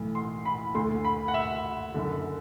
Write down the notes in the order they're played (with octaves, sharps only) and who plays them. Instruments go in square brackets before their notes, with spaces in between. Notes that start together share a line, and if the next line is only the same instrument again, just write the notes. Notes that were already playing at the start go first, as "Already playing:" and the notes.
Already playing: [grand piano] B1 A2 E3 A3
C6
B5
D2 D3 A3 C6
B5
F#5
E5
F#1 F#2 D3